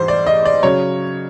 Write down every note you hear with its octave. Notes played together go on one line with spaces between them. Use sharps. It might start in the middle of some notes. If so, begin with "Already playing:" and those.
Already playing: G#2 E3 G3 C5
D5
D#5
D5
C#3 F#3 C#5